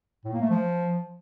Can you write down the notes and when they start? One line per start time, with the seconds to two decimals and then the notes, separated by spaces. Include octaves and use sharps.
0.25 A2
0.33 A#3
0.41 A3
0.50 F3